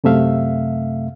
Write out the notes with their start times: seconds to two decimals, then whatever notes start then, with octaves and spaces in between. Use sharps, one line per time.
0.04 F#2 C3 A3 E5 F5